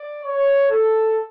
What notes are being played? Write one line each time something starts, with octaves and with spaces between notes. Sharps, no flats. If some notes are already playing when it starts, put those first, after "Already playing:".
Already playing: D5
C#5
A4